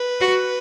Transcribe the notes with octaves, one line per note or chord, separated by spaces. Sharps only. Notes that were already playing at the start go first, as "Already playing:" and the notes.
Already playing: B4
F#4